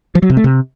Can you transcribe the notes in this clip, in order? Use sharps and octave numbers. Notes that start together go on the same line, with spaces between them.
F3
F#3
C3
A3
C3